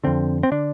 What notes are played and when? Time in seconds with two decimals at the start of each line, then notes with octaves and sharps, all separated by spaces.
0.04 F2 D3 C4
0.43 C4
0.52 D3 D4